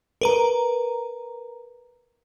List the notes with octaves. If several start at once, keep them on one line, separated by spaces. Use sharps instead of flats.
A#4 B4 A#5